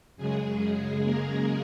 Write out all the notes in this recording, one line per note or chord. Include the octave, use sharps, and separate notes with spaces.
F#2 C#3 G#3 G#4
G#4
A#3 A#4